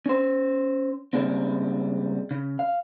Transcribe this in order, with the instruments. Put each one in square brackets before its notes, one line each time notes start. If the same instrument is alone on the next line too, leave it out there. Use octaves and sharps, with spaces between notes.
[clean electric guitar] C#4 C5
C#3 E3 G3 G#3 A#3 C4
C#3
F5